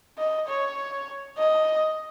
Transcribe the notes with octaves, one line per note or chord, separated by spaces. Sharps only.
D#5
C#5
D#5